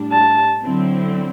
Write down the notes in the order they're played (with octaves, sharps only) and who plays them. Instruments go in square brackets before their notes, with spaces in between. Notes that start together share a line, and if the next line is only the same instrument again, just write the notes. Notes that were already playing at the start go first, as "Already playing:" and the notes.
Already playing: [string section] A2 G3 D4
[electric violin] A5
[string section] D3 F#3 C4 E4